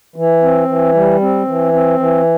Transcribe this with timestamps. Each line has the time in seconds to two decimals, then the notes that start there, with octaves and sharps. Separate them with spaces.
0.16 E3
0.42 C4
0.68 E3
0.94 G3
1.21 C4
1.47 E3
1.73 C4
1.99 E3